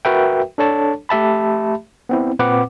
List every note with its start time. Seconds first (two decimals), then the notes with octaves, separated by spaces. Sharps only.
0.05 F#4 A#4 B4 E5 G5
0.58 D4 A4 C#5 A5
1.09 A3 G4 E5 A5 B5
2.09 B3 C4 E4
2.39 A#2 C4 B4 F#5 D6